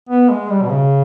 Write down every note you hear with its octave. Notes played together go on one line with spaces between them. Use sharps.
B3
G#3
G3
B2
C#3